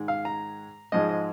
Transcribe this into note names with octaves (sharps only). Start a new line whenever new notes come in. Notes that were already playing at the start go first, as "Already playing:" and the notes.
Already playing: G#2 D#3 G#3
F5
A#5
G#2 F3 G#3 D#5
D#5